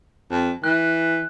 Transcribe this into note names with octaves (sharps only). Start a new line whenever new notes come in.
F2
E3 F#6